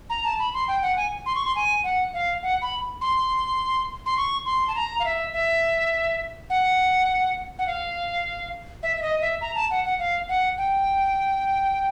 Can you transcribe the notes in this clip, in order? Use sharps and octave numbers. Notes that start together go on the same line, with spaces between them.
A#5
A5
B5
C6
G5
F#5
G#5
C6
C#6
C6
G#5
F#5
F5
F#5
B5
C6
C6
C#6
C6
A5
A#5
F5
E5
E5
F#5
F#5
F5
E5
E5
D#5
E5
A#5
A5
F#5
F#5
F5
F#5
G5